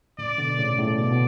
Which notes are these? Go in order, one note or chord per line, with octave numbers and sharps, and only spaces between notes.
A2 C#3 D5
B2 D3
A2 C#3
A2 C#3 D5
B2
B2